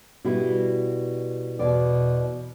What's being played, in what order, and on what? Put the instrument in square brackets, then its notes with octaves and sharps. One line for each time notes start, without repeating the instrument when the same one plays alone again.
[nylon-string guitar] B2 G3 E4
[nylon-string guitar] E2 D5 [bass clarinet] B2